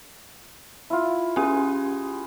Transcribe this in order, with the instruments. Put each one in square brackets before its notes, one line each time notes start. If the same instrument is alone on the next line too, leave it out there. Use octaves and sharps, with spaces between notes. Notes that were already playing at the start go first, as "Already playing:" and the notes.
[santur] E4 F4
[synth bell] C#4 G4 [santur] G#4